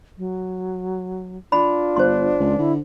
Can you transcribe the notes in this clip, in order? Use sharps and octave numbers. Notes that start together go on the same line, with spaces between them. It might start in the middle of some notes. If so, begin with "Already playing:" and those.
F#3
D4 F4 B5
G1 C5 C6
C#2
D3 E4